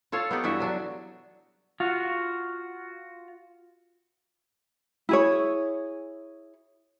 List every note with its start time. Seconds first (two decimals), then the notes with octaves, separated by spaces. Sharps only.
0.12 F4 A4 C#5 F5
0.31 B3 D#4 G4
0.44 G2 E3 F#4 E5
0.60 F#3 D4
1.80 F4 F#4
5.09 E4 G#4 C#5